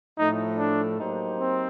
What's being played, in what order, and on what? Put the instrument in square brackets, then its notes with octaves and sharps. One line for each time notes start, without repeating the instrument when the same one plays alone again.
[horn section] A2 F3 A3 [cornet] D#4
[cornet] D4
[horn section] F#3 A#3 D#4 G4 C5
[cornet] C4